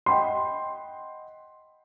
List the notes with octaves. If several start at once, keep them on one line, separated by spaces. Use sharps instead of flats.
D#5 F#5 G5 B5 C6